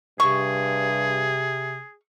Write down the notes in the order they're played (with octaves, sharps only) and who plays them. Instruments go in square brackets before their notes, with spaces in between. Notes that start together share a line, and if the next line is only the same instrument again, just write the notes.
[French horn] G2 [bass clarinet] C3 [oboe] G#4 [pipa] C#6